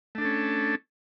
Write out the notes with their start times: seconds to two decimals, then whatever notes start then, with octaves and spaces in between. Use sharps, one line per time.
0.15 A3
0.18 D4
0.21 A4
0.25 C#4